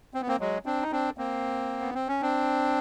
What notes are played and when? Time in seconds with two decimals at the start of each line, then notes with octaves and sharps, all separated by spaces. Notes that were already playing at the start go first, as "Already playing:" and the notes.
0.14 C4
0.21 B3
0.28 A#3 C4
0.40 F#3 G#3
0.66 C4 D4
0.82 D#4
0.92 C4 D4
1.18 A#3 C4
1.81 B3
1.94 C4
2.08 C#4
2.22 C4 D4